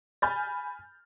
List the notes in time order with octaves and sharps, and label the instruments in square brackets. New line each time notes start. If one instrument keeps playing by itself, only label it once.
[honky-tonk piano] G#5 B5 F6 G6 A6